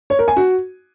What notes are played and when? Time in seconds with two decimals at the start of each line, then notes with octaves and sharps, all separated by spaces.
0.10 C#5
0.19 A#4
0.28 G#5
0.37 F#4